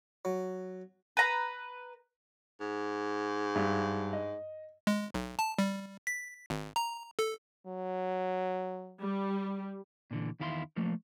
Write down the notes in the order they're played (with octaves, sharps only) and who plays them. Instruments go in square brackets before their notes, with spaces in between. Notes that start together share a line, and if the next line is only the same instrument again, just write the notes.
[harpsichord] F#3
[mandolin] B4 A#5
[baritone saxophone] G#2
[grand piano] G2
D#5
[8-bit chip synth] G#3
B1
A5
G3
B6
G#1
A#5
A4
[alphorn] F#3
[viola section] G3
[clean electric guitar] A#2 D3 E3
E2 D#3 E4 F5 B5 C6
F3 A3 A#3